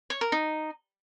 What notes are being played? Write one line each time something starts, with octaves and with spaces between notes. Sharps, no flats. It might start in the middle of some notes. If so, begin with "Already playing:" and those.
C#5
A#4
D#4